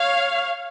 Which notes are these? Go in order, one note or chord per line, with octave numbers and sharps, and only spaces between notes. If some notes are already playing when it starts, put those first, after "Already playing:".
Already playing: C#5 F5